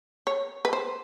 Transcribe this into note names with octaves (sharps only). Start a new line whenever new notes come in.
C#5
B4
C5